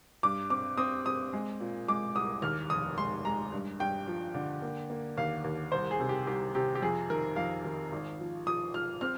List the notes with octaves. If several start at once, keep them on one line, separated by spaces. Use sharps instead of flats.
G2 D6
C4 D6
C4 D#6
C4 D#6
G#3
A#2
G#3 D6
C2 D#6
D#2 F6
F1 D#6
G#3 C6
G#3 A#5
G2
G2 G5
F3
D3
A#3
A#3
D#2 F5
D#2
C2 C5
G#4
C3
G4
C2 G4
C3 G4
G4
F2 G#4
D#3 A#4
F2 F5
D#3
G#1
F3
F3 D#6
F3 F6
C4 F6